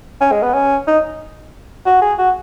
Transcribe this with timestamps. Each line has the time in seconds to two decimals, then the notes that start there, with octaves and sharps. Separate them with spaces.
0.21 C#4
0.32 G#3
0.43 B3
0.54 C#4
0.87 D#4
1.86 F#4
2.02 G#4
2.18 F#4